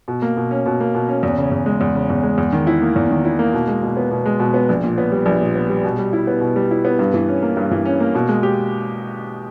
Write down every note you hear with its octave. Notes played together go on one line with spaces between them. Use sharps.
B2
A#3
B2
C#4
B2
A#3
B2
C#4
E2
C#3
E2
G#3
E2
C#3
E2
G#3
E2
D#3
E4
A#3
E2
D#3
E4
A#3
B2
G#3
B2
B3
B2
G#3
B2
B3
A#1
A#2
B3
G3
A#1
A#2
B3
G3
B2
G3
E4
B3
B2
G3
E4
B3
G2
E3
C#4
A#3
G2
E3
C#4
A#3
B2
G#3
G4